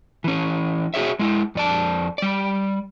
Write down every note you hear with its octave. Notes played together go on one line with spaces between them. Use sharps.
E3 C#4
F#4 G#4 C#5 E5
G#3 E4
F2 D5 A5
G3 D5